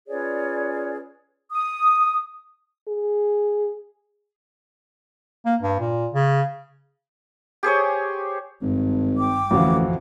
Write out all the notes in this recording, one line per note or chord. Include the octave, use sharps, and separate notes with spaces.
C#4 F4 G#4 B4 C#5 D5
D#6
G#4
A#3
G2
A#2
C#3
G4 G#4 C5 C#5
G#1 G2
G5 D6
A1 F2 D3 E3 F#4 F5